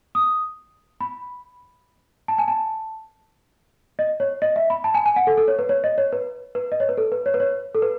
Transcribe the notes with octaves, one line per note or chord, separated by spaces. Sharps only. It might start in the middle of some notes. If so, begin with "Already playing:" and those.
D#6
B5
A5
G#5
A5
D#5
C#5
D#5
E5
B5
A5
G#5
G#5
F#5
A4
A4
C#5
B4
C#5
D#5
C#5
B4
B4
D#5
C#5
B4
A4
B4
C#5
B4
C#5
A4
B4